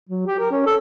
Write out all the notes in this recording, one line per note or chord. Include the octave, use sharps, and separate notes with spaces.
F#3
G4
A#4
C#4
A4